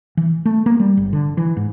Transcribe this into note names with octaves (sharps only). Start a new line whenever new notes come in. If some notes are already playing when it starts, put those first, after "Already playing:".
E3
A3
A#3
G3
G1
D3
E3
G#2